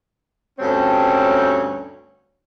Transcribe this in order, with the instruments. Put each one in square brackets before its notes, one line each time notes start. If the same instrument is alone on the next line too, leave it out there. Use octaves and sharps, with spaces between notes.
[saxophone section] D2 G2 C4 C#4 C#5